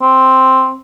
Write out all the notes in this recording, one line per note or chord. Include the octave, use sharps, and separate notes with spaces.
C4